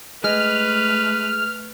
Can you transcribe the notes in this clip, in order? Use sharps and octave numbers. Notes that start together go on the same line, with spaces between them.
G#3 A3 B4 F6